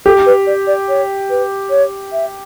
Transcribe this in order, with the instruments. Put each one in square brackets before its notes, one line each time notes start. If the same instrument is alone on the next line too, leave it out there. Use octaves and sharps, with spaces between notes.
[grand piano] G4 [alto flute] A4
[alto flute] B4
D5
D5
C#5
B4
C#5
E5